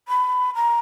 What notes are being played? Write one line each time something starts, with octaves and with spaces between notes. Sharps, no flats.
B5
A#5